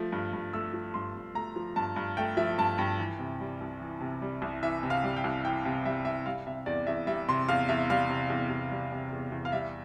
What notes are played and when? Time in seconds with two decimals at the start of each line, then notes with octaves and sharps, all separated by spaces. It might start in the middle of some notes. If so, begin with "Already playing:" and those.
Already playing: F3 A3
0.12 G2
0.33 G2
0.53 A3 E6
0.74 F3
0.94 G2 C6
1.15 G2
1.35 A3 A#5
1.56 F3
1.76 G2 A5
1.96 G2
2.17 A3 G5
2.37 F3 E5
2.58 G2 A5
2.78 G2 G5
2.99 E3
3.19 C3
3.40 G3
3.61 C2
3.81 E3
4.01 C3
4.22 G3
4.42 C2
4.63 E3 E5
4.83 C3
4.90 F5
5.04 G3
5.16 G5
5.24 C2
5.44 E3 G5
5.65 C3
5.85 G3 E5
6.05 C2 E5
6.26 G3 F5
6.47 C3 E5
6.66 E2 D5
6.87 E2 E5
7.07 G3 E5
7.28 C3 C6
7.49 E2 F5
7.69 E2 E5
7.90 G3 F5
8.09 C3
8.30 E2
8.50 E2
8.71 G3
8.92 C3
9.12 E2
9.32 E2
9.45 F5
9.52 G3 E5